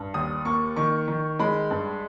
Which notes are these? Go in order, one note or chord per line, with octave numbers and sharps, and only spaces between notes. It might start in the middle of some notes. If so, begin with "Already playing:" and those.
Already playing: G2
D#2 D#6
A#3 C#6
D#3 C#6
D#3
G#3 B5
G2